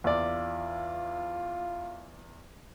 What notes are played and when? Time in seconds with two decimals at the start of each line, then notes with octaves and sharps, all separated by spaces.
0.04 E2 F4 D5